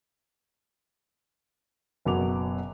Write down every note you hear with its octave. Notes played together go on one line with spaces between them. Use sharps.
F#1 B2 F#3 B3 D6 F7